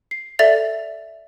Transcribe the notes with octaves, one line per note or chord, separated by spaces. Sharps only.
C7
A4 D5 E5 A6 F7